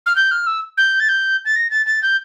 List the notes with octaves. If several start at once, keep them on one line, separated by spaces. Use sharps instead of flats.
F6
G6
F6
E6
G6
A6
G6
A6
A#6
A6
A6
G6